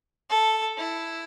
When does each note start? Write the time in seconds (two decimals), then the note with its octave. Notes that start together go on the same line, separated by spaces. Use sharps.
0.30 A4
0.78 E4